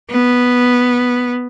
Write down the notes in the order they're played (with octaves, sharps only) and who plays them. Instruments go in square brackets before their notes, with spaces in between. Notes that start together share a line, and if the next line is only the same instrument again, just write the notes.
[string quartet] B3